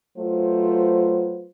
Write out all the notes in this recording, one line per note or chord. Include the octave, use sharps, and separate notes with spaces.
F#3 A3 F4 B4 C5